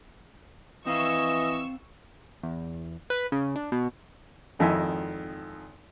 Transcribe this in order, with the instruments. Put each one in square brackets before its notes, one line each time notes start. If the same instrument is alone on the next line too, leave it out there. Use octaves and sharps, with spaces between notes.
[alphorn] E3 [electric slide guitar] C4 F5 [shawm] D#5 [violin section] C#6 E6
[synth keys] E2
B4
C#3
D4
B2
[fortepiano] G#1 F2 D#3 E4 E5 G#5